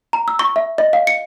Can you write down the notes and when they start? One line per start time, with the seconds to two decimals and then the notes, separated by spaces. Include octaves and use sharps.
0.13 A#5
0.28 E6
0.39 C#6
0.56 E5
0.78 D#5
0.93 F5
1.07 C#7